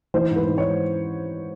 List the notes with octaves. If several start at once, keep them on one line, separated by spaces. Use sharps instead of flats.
E3 C5
G#2
B4
G#2
C#5